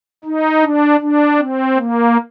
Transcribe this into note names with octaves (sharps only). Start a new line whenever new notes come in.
D#4
D4
D4
C4
A#3